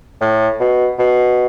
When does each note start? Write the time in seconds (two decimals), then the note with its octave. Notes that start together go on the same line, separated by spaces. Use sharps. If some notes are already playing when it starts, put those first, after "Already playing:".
0.21 A2
0.60 B2
0.99 B2